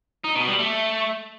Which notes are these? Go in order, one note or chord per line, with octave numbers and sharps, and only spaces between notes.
D#4
B2
G3
A3